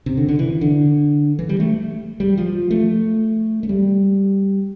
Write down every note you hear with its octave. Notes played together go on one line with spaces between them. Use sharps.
C3
D3
D3
E3
D3
E3
G3
A3
G3
F3
A3
A3
G3